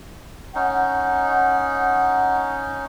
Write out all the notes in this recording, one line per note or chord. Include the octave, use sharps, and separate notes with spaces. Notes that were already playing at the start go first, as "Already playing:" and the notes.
C#4 D#4 F#5